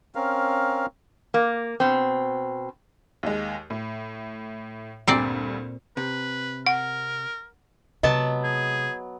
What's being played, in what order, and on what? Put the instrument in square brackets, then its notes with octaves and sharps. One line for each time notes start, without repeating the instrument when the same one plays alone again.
[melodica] C4 C#4 A#4 F5
[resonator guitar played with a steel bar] A#3
B2 C4
[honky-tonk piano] D#2 G#3
A2
[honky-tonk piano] D2 G2 [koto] A#2 C4 D5
[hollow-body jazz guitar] C3 [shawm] B4
[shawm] A#4 [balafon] F#5
[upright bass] C3 G#3 [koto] F#3 B3 A5 [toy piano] D#5
[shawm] G#4